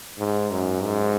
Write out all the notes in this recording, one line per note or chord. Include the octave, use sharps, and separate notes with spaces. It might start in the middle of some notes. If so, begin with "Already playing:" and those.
G#2
F#2
G#2